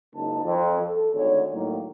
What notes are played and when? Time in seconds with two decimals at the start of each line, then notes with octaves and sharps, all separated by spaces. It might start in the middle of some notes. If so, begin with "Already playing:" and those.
0.14 F#1 C#2 G#2 A#3 D#4 A5
0.44 F2
0.81 A4
1.13 G#1 D2 C#5
1.52 C2 A2 D#3 F#3 A#3